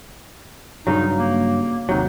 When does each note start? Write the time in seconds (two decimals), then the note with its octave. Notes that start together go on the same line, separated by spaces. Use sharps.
0.87 G2 C#3 F#3 D#4
1.19 A#3
1.89 D#2 C3 F#3 D#4